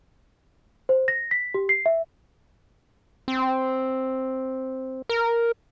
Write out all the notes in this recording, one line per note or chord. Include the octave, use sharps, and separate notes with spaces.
C5
A#6
B6
G4
C7
E5
C4
A#4